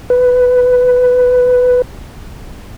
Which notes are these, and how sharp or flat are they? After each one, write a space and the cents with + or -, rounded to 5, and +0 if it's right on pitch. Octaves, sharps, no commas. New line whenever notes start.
B4 +10